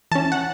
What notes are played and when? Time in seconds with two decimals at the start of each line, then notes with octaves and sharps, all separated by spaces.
0.11 E3 C#4 A5
0.32 F#5